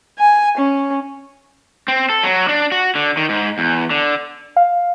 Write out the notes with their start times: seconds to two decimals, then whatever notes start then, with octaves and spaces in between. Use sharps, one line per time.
0.19 G#5
0.57 C#4
1.88 C4
2.10 A4
2.23 F#3
2.49 D4
2.72 F#4
2.95 D3
3.17 D#3
3.29 G#2
3.58 E2
3.91 D3
4.56 F5